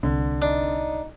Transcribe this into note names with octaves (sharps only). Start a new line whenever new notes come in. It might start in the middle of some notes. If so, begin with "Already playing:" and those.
C2 D3 C4
D4 D#4